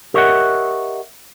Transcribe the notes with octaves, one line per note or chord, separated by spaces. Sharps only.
G4 A#4 C#5 D#5 E5 F#5